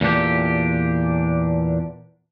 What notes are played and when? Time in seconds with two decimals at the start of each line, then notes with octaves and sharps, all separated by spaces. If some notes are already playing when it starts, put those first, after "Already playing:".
0.01 E2 A#2 D4 G4